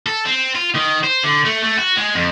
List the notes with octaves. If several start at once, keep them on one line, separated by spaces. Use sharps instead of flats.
A4
C4
F4
D#3
C5
D3
A3
A3
F#4
G#3
F2